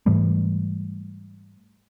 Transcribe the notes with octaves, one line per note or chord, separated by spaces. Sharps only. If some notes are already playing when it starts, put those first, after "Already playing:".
G#2 E3 G3 A3